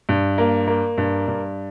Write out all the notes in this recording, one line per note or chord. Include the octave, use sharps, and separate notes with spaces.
G2
A#3
A#3
G2
G2